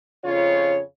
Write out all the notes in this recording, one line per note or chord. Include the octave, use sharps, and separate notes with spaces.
F2 C#3 F4 C#5